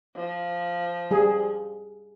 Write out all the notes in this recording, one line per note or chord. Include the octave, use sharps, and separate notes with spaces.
F3
G3 G#4